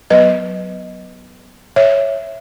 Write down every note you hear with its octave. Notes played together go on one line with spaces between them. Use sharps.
F#3 B3 B4 D#5
C#5 E5